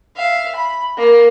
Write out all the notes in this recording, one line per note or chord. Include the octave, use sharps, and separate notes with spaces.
E5 F5
B5
A#3